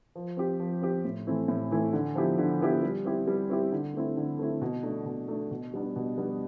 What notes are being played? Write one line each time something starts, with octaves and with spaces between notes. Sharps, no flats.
F3
C4 G4
F3
C4 G4
A2
E3 A3 C4 E4
A2
E3 A3 C4 E4
D3
F3 B3 E4 G4
D3
F3 B3 E4 G4
G3
C4 E4 G4
G3
C4 E4 G4
D3
A3 C4 E4
D3
A3 C4 E4
B2
A3 D4
B2
A3 D4
B2
G3 B3 D4
B2
G3 B3 D4